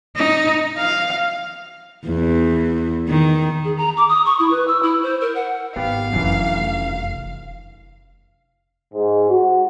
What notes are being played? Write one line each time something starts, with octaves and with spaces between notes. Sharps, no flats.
D#4
F5
E2
D#3
G#4
A#5
D6
D#6
C#6
E4
B4
E6
E4
C5
A#4
F#5
G#1 B3 G4 F5
F1 F#2 E3 D4
G#2
F#4